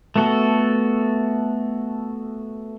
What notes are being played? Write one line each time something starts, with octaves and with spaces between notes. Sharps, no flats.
A3 B3 F#4 A4